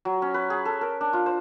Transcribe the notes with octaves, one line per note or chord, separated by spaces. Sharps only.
F#3
C#4
B4
G#4
A4
A#4
D4
F4
C5